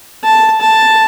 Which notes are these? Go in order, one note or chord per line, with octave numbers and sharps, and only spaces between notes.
A5
A5